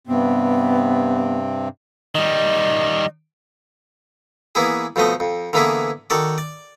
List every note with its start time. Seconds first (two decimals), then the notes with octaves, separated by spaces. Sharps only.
0.07 G2 C3 B3 C4
2.15 D#3 G3 D#5
4.55 E3 A#3 B3 E4 G#4
4.96 F2 B2 F3 A3 D#5
5.20 F2
5.53 D3 E3 A#3 B3 E4 G#4
6.10 D#3 F#4 A4 D5
6.38 D5